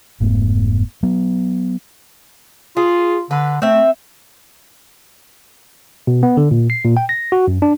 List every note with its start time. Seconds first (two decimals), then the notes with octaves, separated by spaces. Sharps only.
0.20 F1 G#2 A3 B3
1.03 F#3 B3
2.77 F4 G#4
3.31 D3 B4
3.62 A3 C4 E5
6.07 B2
6.23 B3
6.37 D3
6.51 A#2
6.70 C7
6.85 A#2
6.97 G5
7.09 A#6
7.32 F#4
7.48 F#2
7.62 D4